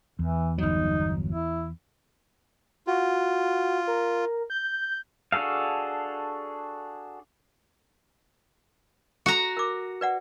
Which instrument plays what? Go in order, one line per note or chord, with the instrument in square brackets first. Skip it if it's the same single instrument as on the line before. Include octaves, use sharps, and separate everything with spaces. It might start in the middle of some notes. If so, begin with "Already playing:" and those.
[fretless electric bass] E2 [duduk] E3
[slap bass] G1 F#3 [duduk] D#4
[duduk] E4
[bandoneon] F4 [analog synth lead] F#4
[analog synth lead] A#4
G6
[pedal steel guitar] D4 F#4 G#4 A4 F5
[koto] F#4 A#5 [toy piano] A4
[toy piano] A#4 D6
B4 D5 F#5